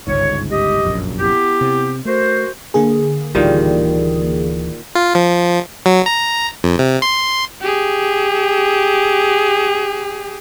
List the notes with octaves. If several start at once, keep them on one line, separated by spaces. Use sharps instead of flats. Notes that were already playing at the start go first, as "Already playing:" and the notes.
G1 C#2 G#2 C#5
G4 D#5
F1 A#1 F#2
B3 E4 G4
C3
A3 F#4 A#4 C5
D3 A#3 G#4
D1 A#2 D#3 E3 G3
F4
F3
F#3
A#5
F2
C3
C6
G4 G#4